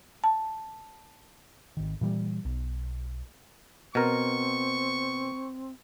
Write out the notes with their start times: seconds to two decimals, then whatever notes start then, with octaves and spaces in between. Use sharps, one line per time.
0.24 A5
1.77 G#1 D#3
2.01 A#2 E3 G3
2.45 B1
3.95 B2 C4 A#4 C#6